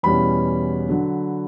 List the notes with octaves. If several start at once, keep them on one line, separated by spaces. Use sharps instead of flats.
E2 B2 G3 C#4 E4 B5
D3 F#3